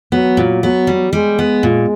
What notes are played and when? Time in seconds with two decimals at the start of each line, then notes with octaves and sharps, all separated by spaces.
0.12 F#3 B3
0.37 A#2
0.63 F#3 B3
0.87 G3
1.13 G3 G#3
1.39 B3
1.63 A#2